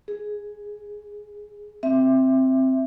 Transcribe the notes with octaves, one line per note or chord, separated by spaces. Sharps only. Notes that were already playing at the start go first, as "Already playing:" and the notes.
G#4
C4 E5